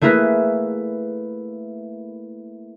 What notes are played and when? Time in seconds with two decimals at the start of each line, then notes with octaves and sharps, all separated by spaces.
0.01 A3 A#3 E4 G#4 A#4 B4